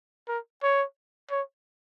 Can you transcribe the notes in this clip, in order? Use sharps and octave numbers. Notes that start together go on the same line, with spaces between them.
A#4
C#5
C#5